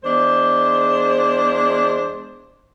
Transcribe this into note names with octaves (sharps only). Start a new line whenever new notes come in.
E2 G#3 D4 C5